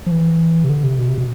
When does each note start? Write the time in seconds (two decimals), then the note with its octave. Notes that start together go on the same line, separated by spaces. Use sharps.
0.06 F3
0.11 E3
0.64 C3
0.69 D3
0.84 C3
0.98 B2
1.08 C3
1.18 B2